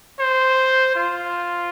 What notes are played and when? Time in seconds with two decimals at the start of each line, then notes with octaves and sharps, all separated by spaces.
0.19 C5
0.96 F4